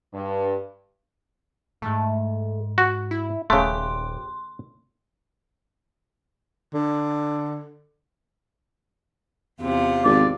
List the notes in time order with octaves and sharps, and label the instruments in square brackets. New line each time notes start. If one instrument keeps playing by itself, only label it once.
[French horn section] G2
[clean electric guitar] B1 G#2 [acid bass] A3
[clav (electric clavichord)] F#4
[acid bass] E4
[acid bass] D#1 [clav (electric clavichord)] C#3 A3 [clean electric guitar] G4 [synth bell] C6
[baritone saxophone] D3
[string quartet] E2 C3 F4
[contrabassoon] G#1 [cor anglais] D5